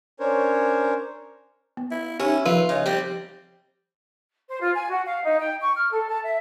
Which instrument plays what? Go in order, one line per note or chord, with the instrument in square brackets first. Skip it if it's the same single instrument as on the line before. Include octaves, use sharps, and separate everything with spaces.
[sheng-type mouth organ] C#4 D4 A#4 C5 C#5
[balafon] B3
[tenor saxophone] E4
[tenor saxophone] C#4 [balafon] D#4 G4 [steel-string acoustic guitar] E4
[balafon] F3 [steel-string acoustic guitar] F4 [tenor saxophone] B4
[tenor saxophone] C#3 [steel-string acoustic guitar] D#4
[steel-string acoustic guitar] G3 C4 [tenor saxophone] G4
[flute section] C5
F4
G#5
F#4
F5
D#4
G5
C#6
F6
A4
A5
E5